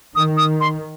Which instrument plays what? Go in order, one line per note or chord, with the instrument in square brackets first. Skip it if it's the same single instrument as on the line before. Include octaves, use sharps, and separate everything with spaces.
[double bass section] D#3 [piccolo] D#6
[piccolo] D#6
C6